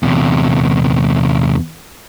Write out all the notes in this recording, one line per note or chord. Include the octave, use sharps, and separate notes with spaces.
E2 C3